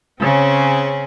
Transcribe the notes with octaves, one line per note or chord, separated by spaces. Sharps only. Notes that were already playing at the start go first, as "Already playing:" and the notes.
C#3 C4 C#4 G#4